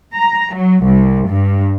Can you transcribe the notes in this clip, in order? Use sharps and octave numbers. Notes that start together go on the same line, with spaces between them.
A#5
F#3
C2
G2